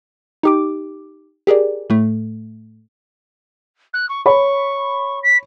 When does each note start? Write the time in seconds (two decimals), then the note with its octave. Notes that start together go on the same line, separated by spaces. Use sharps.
0.43 D#4 G4 D6
1.47 G4 G#4 A#4 D5
1.90 A2 A3
3.93 F#6
4.09 C#6
4.26 C#5 B5 C#6
5.23 B6